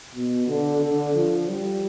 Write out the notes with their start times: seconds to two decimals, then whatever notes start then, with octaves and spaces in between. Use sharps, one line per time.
0.15 B2
0.48 D3
0.81 D3
1.15 F3
1.48 G3